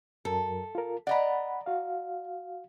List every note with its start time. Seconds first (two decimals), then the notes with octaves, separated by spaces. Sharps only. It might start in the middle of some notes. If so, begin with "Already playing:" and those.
0.25 F#2 F#3 A4 A#4
0.75 F4 A#4
1.07 D5 D#5 F#5 A#5 B5
1.66 F#4 F5